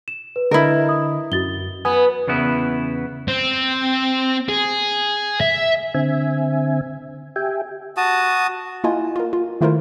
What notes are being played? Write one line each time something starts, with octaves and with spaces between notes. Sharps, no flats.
E7
B4
D3 E4 A#4 D#5
D#6
F#2 F#4 A6 G7
B3 G#5 D#6
E2 C#3 B3 E4
C4
G#4
E5
D3 C4 E5 G#5
G4 E5 G5 G#5
F#4 A5 D#6
A#3 E4 F4 D#5 G#5
F4 A#4
F4
D#3 A3 E4 F4 A#4 C5